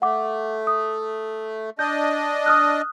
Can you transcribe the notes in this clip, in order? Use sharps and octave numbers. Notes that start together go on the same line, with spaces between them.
A3 F#5 D6
D#6
D4 D#5 G6
D#6 F6 F#6